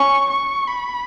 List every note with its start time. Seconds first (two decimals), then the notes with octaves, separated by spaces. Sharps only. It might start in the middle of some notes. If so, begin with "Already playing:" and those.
Already playing: C#4 C#6
0.30 C#6
0.68 B5